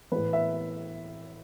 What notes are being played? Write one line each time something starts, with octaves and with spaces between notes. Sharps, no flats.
A2 E3 B4
E5